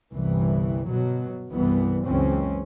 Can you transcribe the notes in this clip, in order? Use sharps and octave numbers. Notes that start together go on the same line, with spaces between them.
G1 C2 E3
B2 F#3
C2 G2 E3 B3
F#1 C#2 E3 C4 C#4